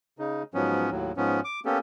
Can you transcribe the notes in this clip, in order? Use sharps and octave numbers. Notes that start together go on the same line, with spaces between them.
C#3 D#4
G#2 F3 F#3 B3 C#4
D#2 A2 F#3
G#2 F3 B3 C#4
D6
A#3 B3 C#4 G4 A4